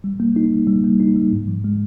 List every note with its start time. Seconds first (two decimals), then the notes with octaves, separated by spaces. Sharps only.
0.04 G3
0.20 A#3
0.36 D#4
0.52 G3
0.67 G3
0.84 A#3
1.00 D#4
1.16 G3
1.32 G#2
1.48 F3
1.64 G#3